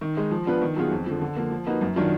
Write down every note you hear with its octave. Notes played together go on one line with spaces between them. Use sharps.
D#3
G#3 D#4
F3
B3 D4 F4 B4
D#3
F#3 B3 F4 G#4
F2
D3 F3
D3
F3 A#3
F3
A#3 D#4 F#4 B4
F#2
D#3 F#3 D4 F4